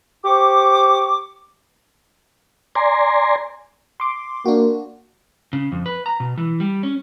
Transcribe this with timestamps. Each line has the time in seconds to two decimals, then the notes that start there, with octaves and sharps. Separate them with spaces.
0.24 G4 C5 C#6 D6
2.75 D5 G#5 A#5 C6
4.00 C6 D6
4.45 A#3 D4 F#4
5.53 C#3
5.72 F2
5.86 B4
6.06 A#5
6.20 B2
6.38 E3
6.60 G3
6.83 C#4